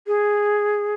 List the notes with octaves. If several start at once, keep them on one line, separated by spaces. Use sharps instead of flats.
G#4